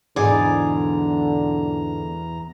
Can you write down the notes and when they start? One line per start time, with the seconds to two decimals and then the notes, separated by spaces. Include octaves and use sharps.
0.16 E2 G#2 B2 D3 E3 G#4 D5 A#5